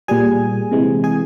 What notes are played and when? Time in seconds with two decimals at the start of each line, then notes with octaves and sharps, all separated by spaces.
0.08 A#2 G3 G#4 G#5
0.71 C3 E3 G#3
1.04 G#4 G#5